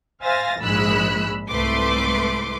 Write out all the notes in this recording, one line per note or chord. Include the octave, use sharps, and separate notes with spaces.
C5 E5 F5 G#5 A6 A#6
A#1 G#2 G#3 B5 E6 F#6
C2 G#2 A3 B4 C6 D6